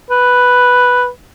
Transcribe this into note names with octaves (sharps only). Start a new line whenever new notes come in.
B4